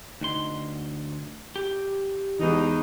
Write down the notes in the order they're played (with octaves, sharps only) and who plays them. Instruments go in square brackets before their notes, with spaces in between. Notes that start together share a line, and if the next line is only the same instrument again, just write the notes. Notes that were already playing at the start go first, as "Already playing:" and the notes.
[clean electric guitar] D2 C6 [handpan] D#4
[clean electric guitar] G4
[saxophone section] E2 D#4 [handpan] E3 F3 G#3